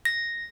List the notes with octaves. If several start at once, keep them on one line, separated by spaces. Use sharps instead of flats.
A#6